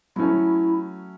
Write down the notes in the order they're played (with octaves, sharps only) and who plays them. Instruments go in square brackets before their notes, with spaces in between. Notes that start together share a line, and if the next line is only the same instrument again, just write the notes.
[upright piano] F#3 A3 C#4 [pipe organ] E4